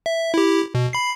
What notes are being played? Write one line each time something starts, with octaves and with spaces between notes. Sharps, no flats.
E5
E4 G4
B2
B5 C7